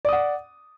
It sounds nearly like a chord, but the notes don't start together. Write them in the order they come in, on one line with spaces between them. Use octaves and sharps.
D5 D#6 F#5